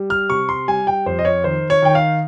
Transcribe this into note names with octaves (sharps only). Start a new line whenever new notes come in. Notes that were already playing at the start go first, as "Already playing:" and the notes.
Already playing: G3
F6
C3 C#6
C6
G3 G#5
G5
F2 C5
D#5
C#5
D#3 C5
C#5
D#3 G5
F5